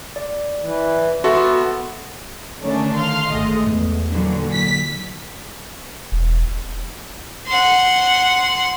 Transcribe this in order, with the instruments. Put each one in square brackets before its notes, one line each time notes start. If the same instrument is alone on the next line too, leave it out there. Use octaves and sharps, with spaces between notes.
[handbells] D5
[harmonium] E3
[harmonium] B3 [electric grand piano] F#4 A4 E5 [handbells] C6
[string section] D3 D#3 A3 C#4 D4
F5 C6
G#1 G#3 A3 D#5
E2
A#2 D3 E3 F#3
B6
[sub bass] E1
[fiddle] F#5 C6